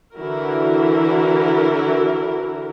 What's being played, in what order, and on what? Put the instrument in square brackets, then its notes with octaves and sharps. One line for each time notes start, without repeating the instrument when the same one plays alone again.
[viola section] D3 E3 E4 F#4 A#4